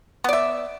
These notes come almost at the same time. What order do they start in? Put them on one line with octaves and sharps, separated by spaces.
B3 D5 E5